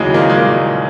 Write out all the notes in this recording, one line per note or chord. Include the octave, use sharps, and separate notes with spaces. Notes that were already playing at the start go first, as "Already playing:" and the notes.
Already playing: D#2 C#3 E3 F#3 G#3
A#2 A#3
G#3
A#2 A#3